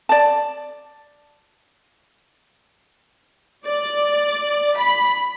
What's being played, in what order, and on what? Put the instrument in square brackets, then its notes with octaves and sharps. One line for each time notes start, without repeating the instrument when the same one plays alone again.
[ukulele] D5 A5
[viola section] D5
B5